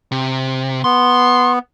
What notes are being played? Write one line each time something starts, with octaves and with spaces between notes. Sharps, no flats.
C3
B3 C6